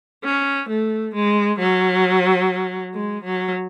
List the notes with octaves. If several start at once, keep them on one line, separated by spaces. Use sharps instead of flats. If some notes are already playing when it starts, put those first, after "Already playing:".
C#4
A3
G#3
F#3
G#3
F#3